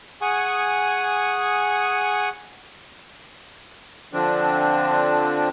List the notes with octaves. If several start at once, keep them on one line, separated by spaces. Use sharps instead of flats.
G#4 F#5 G#5 C#6 D#6
D3 F3 C4 D4